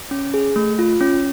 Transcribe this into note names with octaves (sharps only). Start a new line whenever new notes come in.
C#4
G#4
A3
F4
C#4